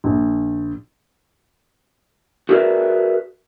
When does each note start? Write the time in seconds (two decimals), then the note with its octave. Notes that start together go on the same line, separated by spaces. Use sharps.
0.04 A#1
2.49 F#4 G#4 A#4 B4 D5 E5